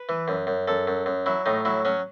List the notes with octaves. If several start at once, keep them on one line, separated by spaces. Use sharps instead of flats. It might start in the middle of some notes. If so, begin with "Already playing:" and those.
Already playing: B4
E3
F#2
F#2
F#2 A4
F#2
F#2
F#3 E4
A2 D#4
F#3 E4
F#3 C#4